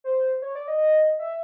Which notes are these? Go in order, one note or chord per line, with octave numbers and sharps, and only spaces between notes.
C5
C#5
D5
D#5
E5